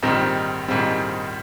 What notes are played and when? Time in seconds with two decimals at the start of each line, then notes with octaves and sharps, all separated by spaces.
0.03 A#1 G#2 D#3 G3 C4
0.68 A#1 G#2 D#3 G3 C4